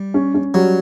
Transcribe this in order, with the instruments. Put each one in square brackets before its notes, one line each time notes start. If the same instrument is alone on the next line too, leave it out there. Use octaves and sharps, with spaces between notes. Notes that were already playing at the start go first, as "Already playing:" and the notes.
Already playing: [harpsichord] G3
[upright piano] C#4
C#4
[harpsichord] F#3 [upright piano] G3